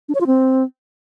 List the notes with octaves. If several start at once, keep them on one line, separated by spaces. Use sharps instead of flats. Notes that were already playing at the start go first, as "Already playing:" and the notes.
D4
C#5
F4
C4